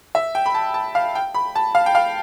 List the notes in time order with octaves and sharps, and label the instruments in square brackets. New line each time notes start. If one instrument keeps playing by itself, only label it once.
[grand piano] E5
G5
B5
A5
A5
F5
G5
B5
A5
F5
G5
F5